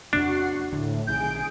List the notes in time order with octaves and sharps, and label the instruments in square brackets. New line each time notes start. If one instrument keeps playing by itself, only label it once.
[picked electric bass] E2 C3 A#3 [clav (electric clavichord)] D4 [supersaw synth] F#4 F#5 C7
[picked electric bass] D1 D3 [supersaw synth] A2
[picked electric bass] B1 C3 D#3 [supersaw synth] G#4 D7 [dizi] G6